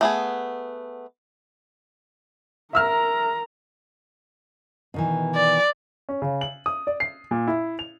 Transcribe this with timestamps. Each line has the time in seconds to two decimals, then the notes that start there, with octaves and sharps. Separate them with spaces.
0.01 A3 B3 G#4
2.73 A#4 E5 A#5 E6 F6
4.94 B2 D#3 E3
5.36 D5
6.09 C#4
6.22 C#3
6.41 F#7
6.66 D#6
6.87 D5
7.00 C7
7.31 A#2
7.48 E4
7.79 F7